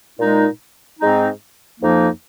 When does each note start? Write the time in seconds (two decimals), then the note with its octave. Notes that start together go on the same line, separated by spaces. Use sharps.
0.19 A#2 G#3 D#4
0.99 G#2 G#3 C4 D#4
1.80 F2 F3 A#3 D#4